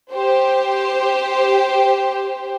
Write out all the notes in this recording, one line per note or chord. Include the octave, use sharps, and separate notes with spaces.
G4 C5